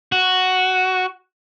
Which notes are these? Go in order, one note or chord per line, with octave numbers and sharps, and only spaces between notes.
F#4